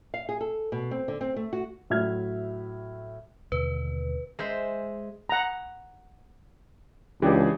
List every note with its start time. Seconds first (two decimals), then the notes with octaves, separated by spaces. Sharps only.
0.14 F5
0.29 G#4
0.41 A4
0.72 B2
0.91 C4
1.08 D3
1.21 C4
1.36 A3
1.53 F#4
1.90 A2 F#3 E5 F6 G#6
3.52 D#2 B2 D3 B4
4.39 G#3 C5 E5
5.29 F#5 A#5
7.22 C#2 E3 D4 G4 G#4